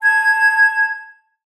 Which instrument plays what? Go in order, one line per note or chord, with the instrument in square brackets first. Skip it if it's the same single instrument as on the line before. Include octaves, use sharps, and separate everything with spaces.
[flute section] A5 G#6